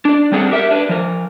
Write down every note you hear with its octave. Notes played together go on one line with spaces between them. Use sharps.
D4 D5
G3 C4 D4 G#4 F5 F#5
G4 A#4 E5
D4 B4
F3 A#4